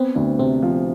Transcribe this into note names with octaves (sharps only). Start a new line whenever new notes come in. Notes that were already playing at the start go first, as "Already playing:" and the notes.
Already playing: B3 C4
D2 D4
C3 C4
F3